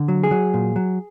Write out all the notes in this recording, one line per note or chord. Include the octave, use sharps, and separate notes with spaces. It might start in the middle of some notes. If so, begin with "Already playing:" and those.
Already playing: D3
F#3
G#4
F#3
A#2
F#3